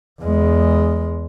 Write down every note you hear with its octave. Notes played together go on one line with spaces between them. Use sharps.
E2 G#3